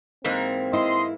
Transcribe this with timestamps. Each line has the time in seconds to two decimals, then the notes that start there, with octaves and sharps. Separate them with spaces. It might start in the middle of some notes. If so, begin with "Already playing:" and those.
0.24 G#2 E3 A#3 C4
0.73 E4 D#5 C6